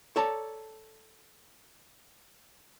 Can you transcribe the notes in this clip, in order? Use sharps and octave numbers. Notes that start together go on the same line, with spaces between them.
A4 C#5 D5 A5 A#5